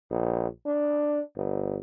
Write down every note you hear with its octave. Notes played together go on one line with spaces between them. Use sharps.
A#1
D4
G1